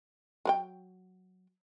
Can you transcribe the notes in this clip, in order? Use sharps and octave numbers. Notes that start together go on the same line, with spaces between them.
F#3 B4 G5